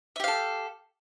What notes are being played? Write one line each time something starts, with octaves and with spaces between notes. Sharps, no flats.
G4 A4 E5 F5